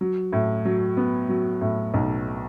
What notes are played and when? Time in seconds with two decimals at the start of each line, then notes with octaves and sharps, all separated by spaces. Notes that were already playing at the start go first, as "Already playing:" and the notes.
0.01 F#3
0.33 A2
0.65 F#3
0.97 B3
1.29 F#3
1.61 A2
1.94 B1